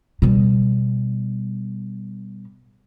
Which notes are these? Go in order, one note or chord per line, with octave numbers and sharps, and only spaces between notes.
B2 G3